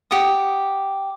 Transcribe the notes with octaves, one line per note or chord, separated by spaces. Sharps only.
G4 F#5 D#6